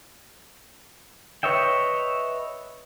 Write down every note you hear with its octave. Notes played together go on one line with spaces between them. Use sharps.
B4 C#5 D#5 E5 G5